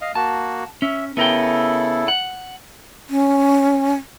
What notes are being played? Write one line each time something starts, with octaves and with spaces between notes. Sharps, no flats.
D#5 F5
A#3 F#4 A5
C#4 E5
C#3 B3 E4 A4 A#4 G5
F#5
C#4